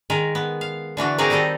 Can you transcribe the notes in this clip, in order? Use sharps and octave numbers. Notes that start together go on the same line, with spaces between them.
D#3 G#3 A#4
B3
F5
D3 E3 D4 F#4
C4 D#4 F#4 G#4 A#4 D5
D#3 G3 D#4 A4 D#5